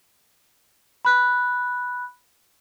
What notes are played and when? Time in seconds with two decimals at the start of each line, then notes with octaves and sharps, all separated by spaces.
1.05 B5 F#6